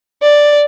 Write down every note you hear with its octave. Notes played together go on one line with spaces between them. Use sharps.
D5